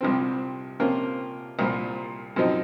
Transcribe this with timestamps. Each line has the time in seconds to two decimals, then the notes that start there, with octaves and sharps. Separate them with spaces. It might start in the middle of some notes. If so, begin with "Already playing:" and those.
0.01 C2 C3 F3 C4
0.80 C3 F3 A#3 C#4 F4
1.59 C2 A#2 F3
2.36 F#2 F3 C4 D#4